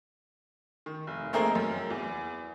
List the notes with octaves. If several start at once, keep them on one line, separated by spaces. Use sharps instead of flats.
D#3
F1
A3 A#3 C4 D#4 G#4 A#4
F#2
E2